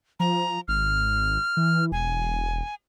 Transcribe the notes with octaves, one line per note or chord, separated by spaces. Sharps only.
F3 A#5
G#1 F6
E3
E1 G#5